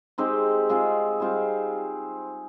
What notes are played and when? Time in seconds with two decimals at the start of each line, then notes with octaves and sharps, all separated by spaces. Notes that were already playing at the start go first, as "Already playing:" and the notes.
0.18 G#3 C4 D#4 G4
0.69 G#3 C4 F4 G#4
1.20 G3 C4 F4 G#4